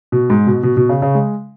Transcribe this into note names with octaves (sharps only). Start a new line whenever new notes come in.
B2
G#2
B2
B2
B2
C#3
C#3
G#3